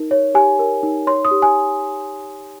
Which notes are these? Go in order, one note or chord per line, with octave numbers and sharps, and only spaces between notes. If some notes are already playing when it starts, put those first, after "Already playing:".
Already playing: D#4 A#4
C#5
G4 G#5
A#4
D#4
C#5 C6
D#6
G4
G#5